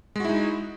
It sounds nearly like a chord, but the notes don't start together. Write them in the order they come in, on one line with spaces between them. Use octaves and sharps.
G#3 F#4 E4 D#4